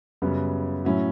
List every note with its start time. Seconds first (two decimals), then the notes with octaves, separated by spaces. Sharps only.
0.22 F#2 C#3 G3 B3
0.85 A2 F#3 C#4 E4